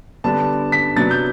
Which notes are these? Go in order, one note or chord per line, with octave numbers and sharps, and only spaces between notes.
D3 G3 B3 D4 A5
B6
C3 F#3 B3 D4 A6
G6